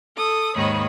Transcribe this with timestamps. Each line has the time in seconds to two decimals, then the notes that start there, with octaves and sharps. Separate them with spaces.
0.15 A4 D#6
0.55 D#2 G#2 D#3 C#5 D#5 B5